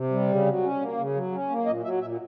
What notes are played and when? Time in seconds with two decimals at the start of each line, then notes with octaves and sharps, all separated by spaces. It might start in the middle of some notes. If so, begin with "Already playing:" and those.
Already playing: C3
0.10 G3
0.27 C#3
0.46 F#3
0.62 C#4
0.80 A#3
0.97 C#3
1.15 F#3
1.32 C#4
1.50 A#3
1.66 A#2 D#5
1.83 F#3 E5
2.01 A#2 E5